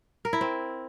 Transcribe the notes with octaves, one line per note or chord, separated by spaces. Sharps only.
A#4
E4
C4